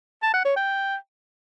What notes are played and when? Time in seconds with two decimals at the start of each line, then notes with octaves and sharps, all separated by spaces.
0.23 A5
0.34 F#5
0.45 C#5
0.56 G5